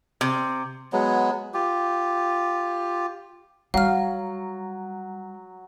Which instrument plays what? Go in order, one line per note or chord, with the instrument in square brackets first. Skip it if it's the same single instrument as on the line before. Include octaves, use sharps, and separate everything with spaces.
[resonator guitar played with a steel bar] C3
[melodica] F#3 G#3 B3
F4 G4
[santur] F#3 [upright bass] G3 [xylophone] F5 F6